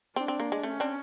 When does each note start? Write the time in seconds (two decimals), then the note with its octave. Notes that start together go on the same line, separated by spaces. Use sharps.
0.16 C4 D4
0.28 C4
0.40 A#3
0.52 G#3
0.63 A3 C#4
0.80 C4 D4